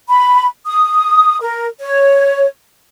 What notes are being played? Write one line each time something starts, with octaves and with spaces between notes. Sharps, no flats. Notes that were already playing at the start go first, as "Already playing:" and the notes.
B5
D#6
A#4
C#5